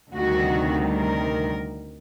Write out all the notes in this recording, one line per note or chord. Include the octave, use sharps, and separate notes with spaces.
D2 C3 D#3 G3 F#4
A#4